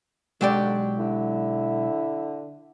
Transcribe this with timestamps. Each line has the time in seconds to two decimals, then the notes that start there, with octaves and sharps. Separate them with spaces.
0.41 B1 D3 F#3 G#3 G4 D5 G5
0.98 D3 E4